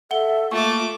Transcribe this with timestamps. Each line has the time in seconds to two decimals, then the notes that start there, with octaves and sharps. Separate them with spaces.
0.11 A4 E5 F#5 G7
0.51 A3 A#3 F4 C#6 D6